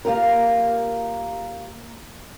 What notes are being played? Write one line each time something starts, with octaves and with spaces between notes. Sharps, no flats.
A#3 F4 G4 A#4